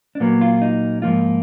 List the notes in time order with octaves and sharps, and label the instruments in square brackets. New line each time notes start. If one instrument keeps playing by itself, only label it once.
[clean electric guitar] D4
A#2 F#3 A#3 B3
F4
D#4
G#2 F3 A#3 F4